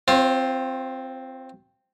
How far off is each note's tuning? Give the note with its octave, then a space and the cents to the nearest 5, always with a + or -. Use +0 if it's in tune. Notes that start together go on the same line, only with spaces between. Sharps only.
C4 +0 F4 +0 C#5 -45